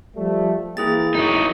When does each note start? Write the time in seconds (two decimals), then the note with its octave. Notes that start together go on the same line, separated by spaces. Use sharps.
0.16 F3 G3 A3
0.77 E3 A#3 E4 G#4 G5 A6
1.15 F#2 A2 F#3 D#4